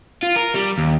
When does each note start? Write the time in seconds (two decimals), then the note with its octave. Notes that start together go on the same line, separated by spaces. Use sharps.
0.23 F4
0.36 A#4
0.54 G3
0.78 D#2